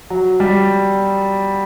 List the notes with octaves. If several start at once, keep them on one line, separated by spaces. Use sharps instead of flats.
F#3
G3